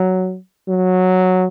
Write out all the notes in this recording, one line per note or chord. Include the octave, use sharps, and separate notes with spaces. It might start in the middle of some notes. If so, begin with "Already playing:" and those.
Already playing: F#3
F#3